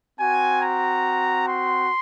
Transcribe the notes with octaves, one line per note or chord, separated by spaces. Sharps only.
C4 F#4 G#5
A#5
C6